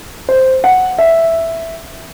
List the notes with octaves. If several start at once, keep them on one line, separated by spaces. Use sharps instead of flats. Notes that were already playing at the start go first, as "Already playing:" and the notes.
C5
F#5
E5